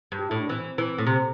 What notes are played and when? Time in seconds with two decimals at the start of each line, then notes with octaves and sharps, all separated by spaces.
0.12 G2
0.19 G4
0.30 A2 E4
0.40 D4
0.49 E3 C4
0.78 E3
0.98 A2
1.07 C3